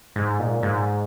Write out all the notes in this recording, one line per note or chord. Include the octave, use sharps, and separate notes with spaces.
G#2
A#2
G#2